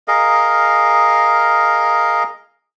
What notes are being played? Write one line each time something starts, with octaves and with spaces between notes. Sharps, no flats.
G#4 A#4 D#5 F5